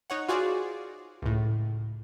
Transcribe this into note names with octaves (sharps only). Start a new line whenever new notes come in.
D#4 C#5 F#5
F4 F#4 G#4 C5 D5
C#2 A2